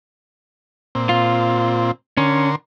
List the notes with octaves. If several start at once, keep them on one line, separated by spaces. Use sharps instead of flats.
A#2 C4
F4
D3 C#4 A#4 C6